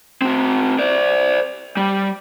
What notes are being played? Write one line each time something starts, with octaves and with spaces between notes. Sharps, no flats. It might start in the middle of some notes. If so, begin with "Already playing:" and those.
C4 F#4
C5 D5
G3